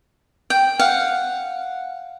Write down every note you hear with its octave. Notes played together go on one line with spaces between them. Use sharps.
G5
F5 F#5